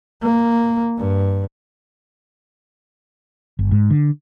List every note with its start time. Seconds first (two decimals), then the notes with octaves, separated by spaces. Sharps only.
0.21 A#3
0.97 G2
3.59 G1
3.71 G#2
3.90 D3